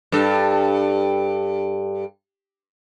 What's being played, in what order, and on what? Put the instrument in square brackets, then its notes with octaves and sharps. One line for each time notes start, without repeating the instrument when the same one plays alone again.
[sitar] G2 A4